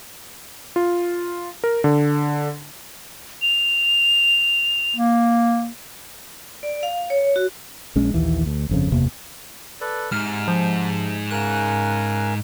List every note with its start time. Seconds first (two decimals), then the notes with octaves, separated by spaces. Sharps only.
0.76 F4
1.64 A#4
1.84 D3
3.42 F7
4.97 A#3
6.63 D5
6.83 F5
7.10 C#5
7.36 F#4
7.96 A#1 G#3 C#4
8.14 A#1 D#2 E3
8.46 D2
8.69 G1 F2 C#3
8.91 F#1 E2 C3 A#3
9.81 A4 B4 D5
10.12 G#2 C3 F6
10.48 F3
11.31 C#3 A#4 G#5 F#6